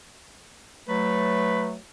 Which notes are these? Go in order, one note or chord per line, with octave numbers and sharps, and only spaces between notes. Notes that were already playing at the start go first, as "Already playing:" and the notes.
F#3 A3 B4